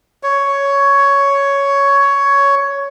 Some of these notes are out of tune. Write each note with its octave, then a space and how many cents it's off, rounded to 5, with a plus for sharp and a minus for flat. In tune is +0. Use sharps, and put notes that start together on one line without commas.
C#5 +10